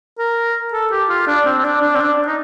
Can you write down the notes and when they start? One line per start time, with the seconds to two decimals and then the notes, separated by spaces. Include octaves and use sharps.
0.19 A#4
0.73 A4
0.91 G4
1.09 F4
1.27 D4
1.45 C4
1.58 C4
1.64 D4
1.81 D4
1.95 C4
2.00 D4
2.27 D#4